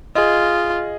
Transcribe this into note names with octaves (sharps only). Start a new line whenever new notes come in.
F4 G#4 D#5